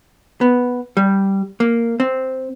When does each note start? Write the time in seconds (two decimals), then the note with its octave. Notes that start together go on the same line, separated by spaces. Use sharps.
0.41 B3
0.97 G3
1.60 A#3
2.00 C4